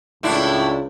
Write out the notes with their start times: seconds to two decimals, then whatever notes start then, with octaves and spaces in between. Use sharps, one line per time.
0.23 C#2 A2 D4 E4